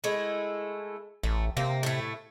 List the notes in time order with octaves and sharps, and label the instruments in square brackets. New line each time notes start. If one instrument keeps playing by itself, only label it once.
[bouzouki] G#3 A3 E4
[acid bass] A1 [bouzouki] A3
[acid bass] C3 [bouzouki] A#3
[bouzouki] A2 A3